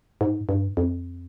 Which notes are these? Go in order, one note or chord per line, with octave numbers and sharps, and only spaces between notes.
G#2
G2
F2